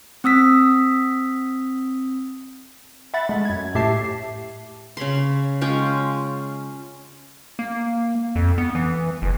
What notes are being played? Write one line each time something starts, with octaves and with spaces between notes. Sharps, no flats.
C4 D#6 E6 B6
E5 F#5 B5 A6
G#3 A3
F#2 G#6
A2 A3 G4 E5 A5 C7
C#3 C#5 B5 C6
G#3 C#4 F4 G5
A#3
F2
B3
E3
F#1